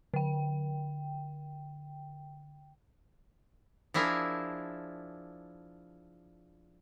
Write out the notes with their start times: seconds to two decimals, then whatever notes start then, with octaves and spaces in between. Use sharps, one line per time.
0.14 D3 G5
3.94 F3 D4 E4 G#4 A#4 E5